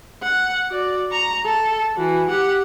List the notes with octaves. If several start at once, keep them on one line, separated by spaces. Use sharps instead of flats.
F#5
F#4 D5
A#5 C#6
A4
E3 F#4
G4 F#5